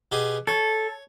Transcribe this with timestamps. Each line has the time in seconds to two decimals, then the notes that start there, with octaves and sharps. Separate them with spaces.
0.12 B2 G4 G#4
0.47 A4 C#5